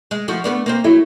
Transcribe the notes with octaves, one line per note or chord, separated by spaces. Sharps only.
G#3
F3 A3 F#4
A3 B3 D4
A#3 C4 C5
F#3 A3 E4